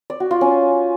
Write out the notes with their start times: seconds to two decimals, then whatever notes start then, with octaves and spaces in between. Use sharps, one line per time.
0.10 D5
0.20 F#4
0.31 F4
0.41 C#4